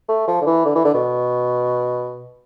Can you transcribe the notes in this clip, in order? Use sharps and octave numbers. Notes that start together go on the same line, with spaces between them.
A3
F3
D3
E3
D3
E3
D3
B2